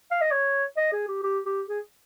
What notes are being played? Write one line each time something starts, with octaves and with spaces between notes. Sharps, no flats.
F5
D#5
C#5
D#5
G#4
G4
G4
G4
G#4